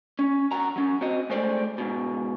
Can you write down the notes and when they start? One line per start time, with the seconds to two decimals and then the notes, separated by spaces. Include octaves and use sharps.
0.19 C#4
0.51 F#2 F#4 A#5
0.76 F#3 C#4
1.01 C4 F#4 D#5
1.30 G#3 A3 C5 D5
1.78 G#2 B2